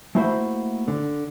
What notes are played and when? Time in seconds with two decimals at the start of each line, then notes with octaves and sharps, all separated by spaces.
0.15 A3 A#3 E4 F#4 C5 B5
0.88 D3